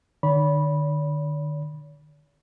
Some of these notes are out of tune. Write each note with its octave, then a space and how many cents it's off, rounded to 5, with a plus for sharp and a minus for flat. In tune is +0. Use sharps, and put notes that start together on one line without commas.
D3 +45 C#5 +45 B5 -10